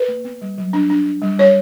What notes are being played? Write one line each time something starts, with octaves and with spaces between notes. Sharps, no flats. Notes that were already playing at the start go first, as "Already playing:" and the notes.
Already playing: B4
A#3
B3
G3
F#3
D4
D4
D4
G3
G3 C#5